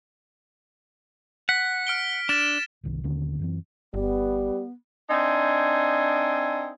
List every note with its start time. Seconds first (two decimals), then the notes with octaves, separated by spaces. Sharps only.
1.49 F#5 B6
1.87 F6 D7 G7
2.29 D4 A6 E7
2.83 G1 C2 D#3
3.04 D#1 D#2 D3 C#4
3.39 F#2 E3 C4
3.94 G1 G3 B3
5.10 C4 D4 D#4 E5 G#5